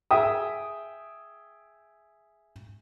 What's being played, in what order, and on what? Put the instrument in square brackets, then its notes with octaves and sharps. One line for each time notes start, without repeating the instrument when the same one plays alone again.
[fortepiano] G#4 E5 G5 D#6